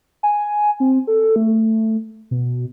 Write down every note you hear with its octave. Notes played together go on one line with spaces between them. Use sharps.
G#5
C4
A4
A3
B2